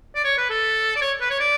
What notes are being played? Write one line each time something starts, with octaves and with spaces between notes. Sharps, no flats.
D5
C#5
B4
A4
D5
C#5
B4
C#5
D5